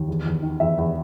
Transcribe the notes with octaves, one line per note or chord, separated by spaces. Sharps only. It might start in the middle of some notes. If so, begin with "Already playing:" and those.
Already playing: D#2
E2
E2
D#3
E2 E5
E2